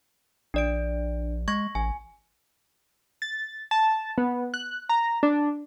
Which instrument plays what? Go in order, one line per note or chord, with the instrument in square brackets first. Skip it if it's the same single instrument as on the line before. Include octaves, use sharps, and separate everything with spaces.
[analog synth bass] A#1 [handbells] D4 D5 D7
[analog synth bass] G#3 [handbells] C#6 G#6 A#6
[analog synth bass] A1 [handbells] G#5
[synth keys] A6
A5
B3
F#6
A#5
D4